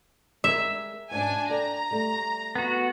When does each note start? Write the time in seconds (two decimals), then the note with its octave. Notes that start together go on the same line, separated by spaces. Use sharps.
0.44 G3 G#3 A#4 E5
1.11 G#2 B2 C#4 D4 G#5
1.49 A4 D5 G5 A#5
1.91 G3 A3
2.55 B3 F#4